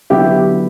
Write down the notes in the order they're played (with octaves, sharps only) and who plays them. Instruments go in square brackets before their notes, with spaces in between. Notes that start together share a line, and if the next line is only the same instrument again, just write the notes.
[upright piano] D3 F#3 B3 F#4 [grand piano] E4 G4